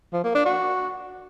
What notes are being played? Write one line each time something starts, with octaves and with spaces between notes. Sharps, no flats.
F3
A#3
D4
F#4